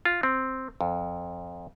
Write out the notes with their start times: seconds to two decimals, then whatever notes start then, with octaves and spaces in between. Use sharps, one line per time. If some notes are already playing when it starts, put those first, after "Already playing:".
0.05 F4
0.23 C4
0.81 F2